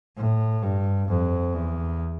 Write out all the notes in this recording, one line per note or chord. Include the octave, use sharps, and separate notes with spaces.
A2
G2
F2
E2